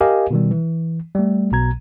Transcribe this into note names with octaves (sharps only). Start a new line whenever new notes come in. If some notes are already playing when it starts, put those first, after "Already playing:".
G4 A#4 D#5 F5 G#5
B2 D#3 G3
E3
G3 A3
B1 B2 A#5 G#6